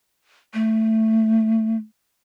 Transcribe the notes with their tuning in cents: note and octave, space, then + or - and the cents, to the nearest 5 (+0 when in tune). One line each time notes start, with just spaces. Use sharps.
A3 +10